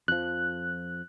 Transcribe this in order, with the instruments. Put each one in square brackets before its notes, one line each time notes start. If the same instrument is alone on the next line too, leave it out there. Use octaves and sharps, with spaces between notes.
[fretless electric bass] F2 F3 [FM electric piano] F#6